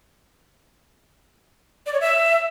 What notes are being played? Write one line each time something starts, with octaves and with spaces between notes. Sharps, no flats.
D5
C#5
E5